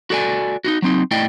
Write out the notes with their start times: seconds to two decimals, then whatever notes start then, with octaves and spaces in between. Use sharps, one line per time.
0.10 F#4 A4 D5 G#5
0.64 D#4 F4 F#4
0.82 F#3 C4 D#4
1.11 A2 E4 D5 D#5 G5